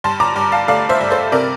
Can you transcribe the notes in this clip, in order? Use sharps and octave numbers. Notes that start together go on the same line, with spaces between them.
G2 A5 C6
A#5 D6
G2
F5 A5
A3 D5 F5
C5 E5
G2
A4 C5
C3 A#4 D5